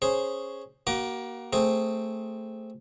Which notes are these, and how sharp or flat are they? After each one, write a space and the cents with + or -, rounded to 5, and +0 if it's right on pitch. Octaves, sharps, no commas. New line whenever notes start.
C#4 +0 G#4 +0 C5 +0
A#3 +20 F#4 +35 D6 +0
A3 +10 C4 +0 G#4 +0